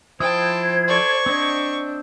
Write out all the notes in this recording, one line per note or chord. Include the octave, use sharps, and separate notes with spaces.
F3 E4 C5 G5 A5 D#6 G#6
A4 D5 C#6
C4 D4 D#5